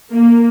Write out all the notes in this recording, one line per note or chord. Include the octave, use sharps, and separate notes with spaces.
A#3